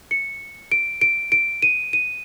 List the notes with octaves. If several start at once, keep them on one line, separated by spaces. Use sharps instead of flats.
C#7
D7
D7
D7
D#7
D#7